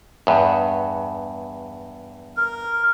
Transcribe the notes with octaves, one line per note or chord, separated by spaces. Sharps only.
E2 G2
A#4